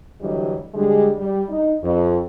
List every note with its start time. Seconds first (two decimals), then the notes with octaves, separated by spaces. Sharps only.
0.21 D2 D3 E3 F#3 G3 D#5
0.74 D3 G3 G#3
1.18 G3
1.49 D#4
1.82 F2